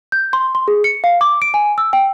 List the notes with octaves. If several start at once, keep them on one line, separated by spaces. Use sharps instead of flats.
G6
C6
C6
G#4
C#7
F5
D6
D7
G#5
E6
G5